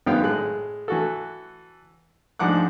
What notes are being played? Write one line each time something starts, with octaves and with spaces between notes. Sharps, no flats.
G#1 F#2 D#3 B3 F5 G5
A2 G#3 F#6
E3 F#4 A4
G#2 F3 D4 F#5 D6 F#6